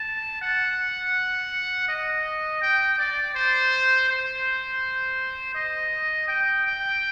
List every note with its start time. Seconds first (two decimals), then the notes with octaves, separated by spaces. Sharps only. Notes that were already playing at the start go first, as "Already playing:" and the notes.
Already playing: A5
0.42 F#5
1.89 D#5
2.62 G5
2.98 D5
3.35 C5
4.09 C5
5.55 D#5
6.28 G5
6.65 G5